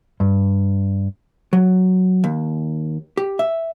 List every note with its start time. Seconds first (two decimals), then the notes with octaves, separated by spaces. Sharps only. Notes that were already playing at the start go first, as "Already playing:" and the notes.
0.20 G2
1.53 F#3
2.24 D#2
3.17 G4
3.39 E5